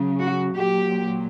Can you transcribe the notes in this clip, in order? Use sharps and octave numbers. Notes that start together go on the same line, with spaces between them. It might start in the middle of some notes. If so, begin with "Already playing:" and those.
Already playing: C#3 F#3
F#4
A#2 F#3 G4